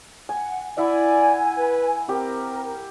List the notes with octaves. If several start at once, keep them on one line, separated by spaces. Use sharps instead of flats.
F#5 G#5
E4 D5 E5 F#5 G#5
B4
C4 G4 A#4